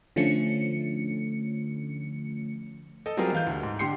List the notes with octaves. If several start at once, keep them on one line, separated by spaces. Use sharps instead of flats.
D3 F3 A3 C#4 C#7
A4 D#5
F#3 G3 C4 F4 G#4 A#4
E3 F5 G6
D2
G#2
D3 G4 C6 C7 C#7